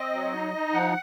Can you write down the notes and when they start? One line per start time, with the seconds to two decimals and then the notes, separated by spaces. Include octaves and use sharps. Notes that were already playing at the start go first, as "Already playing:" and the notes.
Already playing: C4 D#5
0.13 F#3
0.33 D#4
0.54 D#4
0.74 F3 F#5